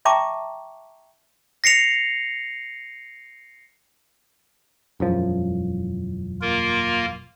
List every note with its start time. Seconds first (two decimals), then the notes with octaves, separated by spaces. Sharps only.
0.05 E5 G5 A5 A#5 C#6 D6
1.64 A#6 C7 C#7 F7
5.00 E1 F#2 F3
6.41 A#3 F4 A#4